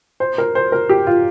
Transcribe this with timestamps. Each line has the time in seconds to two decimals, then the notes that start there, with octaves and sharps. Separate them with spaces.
0.20 C5
0.38 A#4
0.55 C5
0.72 A#4
0.89 G4
1.07 F4